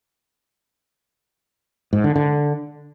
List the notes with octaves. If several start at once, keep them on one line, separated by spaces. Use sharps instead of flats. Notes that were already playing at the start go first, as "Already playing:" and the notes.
G#2
D3
D3